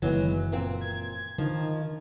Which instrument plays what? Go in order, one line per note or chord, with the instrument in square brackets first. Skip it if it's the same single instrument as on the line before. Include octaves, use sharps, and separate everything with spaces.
[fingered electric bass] F#1 D#3 [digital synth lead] E3 [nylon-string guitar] F#3 G#3 B3
[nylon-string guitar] A#2 C4
[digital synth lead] G#6
[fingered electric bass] D3 [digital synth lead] D#3 [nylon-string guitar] F3